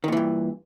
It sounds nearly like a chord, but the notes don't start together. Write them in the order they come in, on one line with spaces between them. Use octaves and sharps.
D#3 A#2 E3 G2